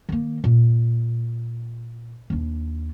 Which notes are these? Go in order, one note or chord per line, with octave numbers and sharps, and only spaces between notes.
D#3 A#3
A#2
D#2 D4